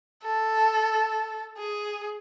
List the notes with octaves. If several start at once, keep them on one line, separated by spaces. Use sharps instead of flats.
A4
G#4